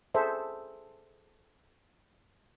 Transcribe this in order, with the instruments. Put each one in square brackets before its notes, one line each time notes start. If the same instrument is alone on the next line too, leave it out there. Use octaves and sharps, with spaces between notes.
[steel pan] G#4 A4 C5 E5